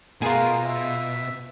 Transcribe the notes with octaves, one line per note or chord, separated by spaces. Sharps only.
B2 F4 G#4 A#4
E5